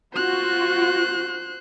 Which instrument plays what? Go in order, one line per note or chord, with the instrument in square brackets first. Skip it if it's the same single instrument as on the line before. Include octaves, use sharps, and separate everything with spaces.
[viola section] F4 F#4 [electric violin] C5 F#6